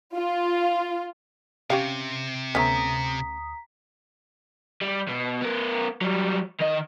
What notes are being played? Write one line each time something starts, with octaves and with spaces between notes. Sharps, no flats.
F4
C3 C#4 G4 F5
D2 A3 B3 C#4 A#5 D#6 B6
G3
B2
B3 A#4
F#3 G3
D#3 D#5